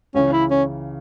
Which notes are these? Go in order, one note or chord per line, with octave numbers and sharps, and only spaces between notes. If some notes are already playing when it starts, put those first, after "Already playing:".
C#2 C#3 E3 C#4
E4
C#4